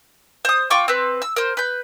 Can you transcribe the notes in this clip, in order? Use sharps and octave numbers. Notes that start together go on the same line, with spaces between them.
C5 D#6
F4 G5 C#6 D6
C4 B4
E6
A#4 C5
B4 G6